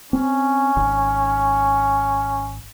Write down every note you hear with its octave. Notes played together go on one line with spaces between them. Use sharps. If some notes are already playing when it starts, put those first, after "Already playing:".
C4 C#4
G#1